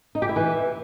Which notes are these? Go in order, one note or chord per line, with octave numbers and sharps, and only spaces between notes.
D#4
G4
E4
E3